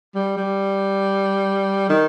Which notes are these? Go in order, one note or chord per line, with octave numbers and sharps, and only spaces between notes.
G3
G3
D#3